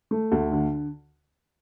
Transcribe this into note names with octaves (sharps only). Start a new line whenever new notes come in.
A3
D2
D3